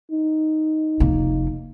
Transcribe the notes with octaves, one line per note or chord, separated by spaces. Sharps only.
D#4
F1 A#3